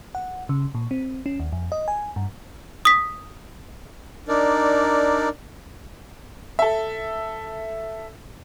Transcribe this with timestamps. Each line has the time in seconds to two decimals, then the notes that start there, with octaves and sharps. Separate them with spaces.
0.15 F#5
0.49 C#3
0.75 A#2
0.91 C4
1.26 C#4
1.40 D#2
1.52 F2
1.72 D#5
1.88 G#5
2.16 G2
2.85 D#6 B6
4.28 D4 D#4 A#4 D5
6.59 A4 E5